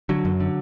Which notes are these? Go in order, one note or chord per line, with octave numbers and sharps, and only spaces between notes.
D3 F#3
F#2
D3